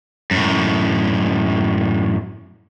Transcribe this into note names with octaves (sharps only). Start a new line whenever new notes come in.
F#2 A2